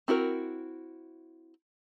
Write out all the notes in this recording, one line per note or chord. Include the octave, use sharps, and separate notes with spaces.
C4 E4 F#4 A#4